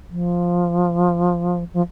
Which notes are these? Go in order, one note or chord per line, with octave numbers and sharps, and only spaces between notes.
F3
F3